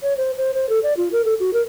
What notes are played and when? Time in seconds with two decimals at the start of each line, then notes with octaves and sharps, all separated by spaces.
0.02 C#5
0.17 C5
0.38 C5
0.55 C5
0.69 A4
0.83 D5
0.97 F4
1.12 A#4
1.25 A4
1.40 F#4
1.53 A#4